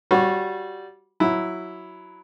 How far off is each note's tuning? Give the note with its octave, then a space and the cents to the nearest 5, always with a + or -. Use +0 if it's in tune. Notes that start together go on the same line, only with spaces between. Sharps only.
G3 -10 F#4 -10 C#5 -30
F#3 +0 E4 +0